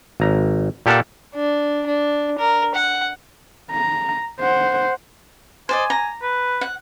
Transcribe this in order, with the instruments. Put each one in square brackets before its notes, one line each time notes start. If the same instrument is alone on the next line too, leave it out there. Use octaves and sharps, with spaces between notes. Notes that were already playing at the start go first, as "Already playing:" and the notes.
[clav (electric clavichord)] G#1 A#5
A#2 G4 A4 F5 F#5 A5
[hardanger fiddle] D4
D4
A#4
F#5
[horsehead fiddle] A#5
C5 F#5
[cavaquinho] C5 D5 D#5 [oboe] G#5
[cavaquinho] A#5
[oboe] B4
[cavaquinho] F#5